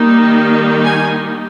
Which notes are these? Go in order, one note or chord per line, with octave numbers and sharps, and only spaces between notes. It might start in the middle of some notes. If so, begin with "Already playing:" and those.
Already playing: D#3 G3 A#3 D#4
G#5